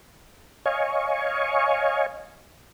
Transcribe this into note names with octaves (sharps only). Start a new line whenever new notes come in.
C#5 D#5 F5 G#5 C#6